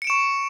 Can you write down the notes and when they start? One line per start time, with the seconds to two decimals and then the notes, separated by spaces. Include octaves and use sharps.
0.02 C#7
0.04 D7
0.07 E7
0.10 C#6